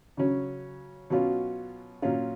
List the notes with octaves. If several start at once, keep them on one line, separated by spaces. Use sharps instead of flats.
C#3 F#3 C#4
B2 F#3 C#4 F4
A#2 F#3 C#4 F4